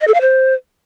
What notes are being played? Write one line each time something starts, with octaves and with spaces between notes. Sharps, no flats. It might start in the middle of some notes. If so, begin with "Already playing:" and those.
D#5
A4
F5
C5